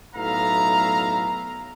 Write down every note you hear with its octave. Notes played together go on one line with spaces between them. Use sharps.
B1 A2 B3 E5 F5 A#5